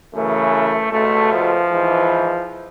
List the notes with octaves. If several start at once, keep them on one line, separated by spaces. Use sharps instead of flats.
F#2 C#3 E3 A3
C#2 B2 A3
F3
G#2 E3